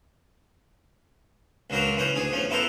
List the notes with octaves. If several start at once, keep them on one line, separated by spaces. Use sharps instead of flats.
C#2 C#3 F#3 D4 A#4 C5
E3 C#4 C5
D2 D4 G#4
E2 F3 C#4
B3 E4 A4 A#4 C5